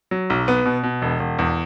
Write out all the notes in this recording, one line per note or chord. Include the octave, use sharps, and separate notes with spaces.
F#3
B1
B3
B2
B2
E1
E1
E2